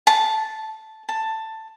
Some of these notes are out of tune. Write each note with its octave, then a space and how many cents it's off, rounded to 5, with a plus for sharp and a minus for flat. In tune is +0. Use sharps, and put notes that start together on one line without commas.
A5 -5
A5 +10